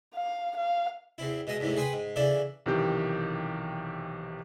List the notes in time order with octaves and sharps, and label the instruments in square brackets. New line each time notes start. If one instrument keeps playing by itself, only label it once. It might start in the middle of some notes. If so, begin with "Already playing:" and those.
[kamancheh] F5
F5
[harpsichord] E2 C4 E4
B2 G#3 D#5 E5
E2 G#2 C3 E3 A3
G#4 B4 C5 G5 G#5 B5
G#2
C#3 E3 D4 E4 A4
[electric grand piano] B1 C3 D#3 E3 G4 G6